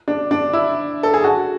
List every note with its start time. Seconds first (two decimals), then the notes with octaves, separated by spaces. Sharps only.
0.08 D4
0.31 D4
0.53 E4
1.03 A4
1.14 G#4
1.24 F#4